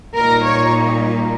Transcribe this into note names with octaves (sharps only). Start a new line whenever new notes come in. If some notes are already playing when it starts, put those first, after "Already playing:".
A#2 G3 A#3 D#4 A#4
C#5